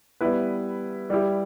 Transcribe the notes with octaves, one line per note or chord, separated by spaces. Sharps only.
G3 B3 E4 B4
G3 E4 G4